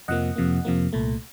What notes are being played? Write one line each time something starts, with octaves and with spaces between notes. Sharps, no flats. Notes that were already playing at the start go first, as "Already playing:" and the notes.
F2 C3 F3 A#3 D#5 F#5
F2 C3 F3 A#3
F2 C3 F3 A#3
C2 A#2 A3